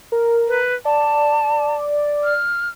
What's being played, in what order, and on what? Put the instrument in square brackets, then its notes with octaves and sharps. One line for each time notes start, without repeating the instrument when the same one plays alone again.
[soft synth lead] A#4
[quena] B4
[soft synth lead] D5 [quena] A5
[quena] F6